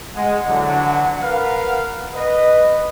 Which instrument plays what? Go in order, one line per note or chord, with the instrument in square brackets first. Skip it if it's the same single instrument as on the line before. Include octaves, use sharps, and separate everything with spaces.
[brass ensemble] G#3 [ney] F#5
[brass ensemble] D3 E3 F#3
A#4 B4 F5
B4 D#5